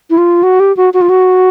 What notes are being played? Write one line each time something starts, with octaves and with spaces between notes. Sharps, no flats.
E4
F4
F#4
G4
F#4
F#4
F4
F#4